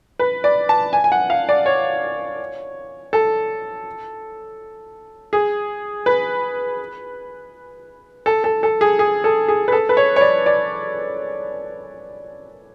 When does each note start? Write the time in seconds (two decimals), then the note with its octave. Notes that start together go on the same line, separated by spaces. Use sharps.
0.19 B4
0.44 D5
0.69 A5
0.93 G#5
1.04 G#5
1.12 F#5
1.30 F5
1.49 D5
1.66 C#5
3.13 A4
5.33 G#4
6.06 B4
8.26 A4
8.44 A4
8.63 A4
8.81 G#4
8.99 G#4
9.24 A4
9.48 G#4
9.68 B4
9.72 A4
9.89 B4
9.97 C#5
10.16 C#5
10.21 D5
10.46 D5